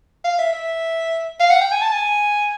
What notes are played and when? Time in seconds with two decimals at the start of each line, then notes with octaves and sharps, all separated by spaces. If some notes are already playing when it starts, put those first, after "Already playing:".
0.24 F5
0.39 E5
0.53 E5
1.40 F5
1.50 F#5
1.61 G5
1.72 G#5
1.82 A5
1.92 G#5